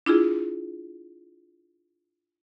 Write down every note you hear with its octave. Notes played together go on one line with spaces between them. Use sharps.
D4 E4 F4 G#4